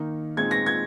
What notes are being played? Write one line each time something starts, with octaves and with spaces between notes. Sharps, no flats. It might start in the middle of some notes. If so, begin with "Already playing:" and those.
Already playing: D#3 A#3 D#4
A#2 G#3 C4 D#4 G#6
A#6
G#6